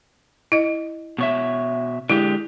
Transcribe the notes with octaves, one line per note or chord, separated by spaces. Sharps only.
E4 D#5
B2 C#5 E5
D3 G#3 E4 G4